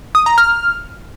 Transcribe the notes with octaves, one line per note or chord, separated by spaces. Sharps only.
D#6
A#5
F6